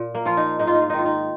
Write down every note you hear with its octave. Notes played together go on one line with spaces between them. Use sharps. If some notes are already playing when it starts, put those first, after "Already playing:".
Already playing: A#2
A#3
F3 F4
D#4
G#2 D#4
F4
D#4
F4
D#3 D#4
F4
D#4